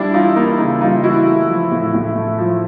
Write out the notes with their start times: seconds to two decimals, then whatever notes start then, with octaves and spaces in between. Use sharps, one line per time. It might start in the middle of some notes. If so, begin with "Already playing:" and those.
Already playing: G3 D4 E4
0.14 E3 D#4 F4
0.36 A#3 D#4
0.58 C#3 D#4
0.81 G3 D#4 F4
1.04 E3 E4 F#4
1.26 A3
1.48 F3
1.71 A2
1.94 A2
2.16 A3
2.38 F3